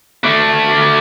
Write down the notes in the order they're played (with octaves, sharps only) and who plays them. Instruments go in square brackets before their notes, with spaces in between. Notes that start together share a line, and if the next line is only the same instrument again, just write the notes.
[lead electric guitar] A3 D4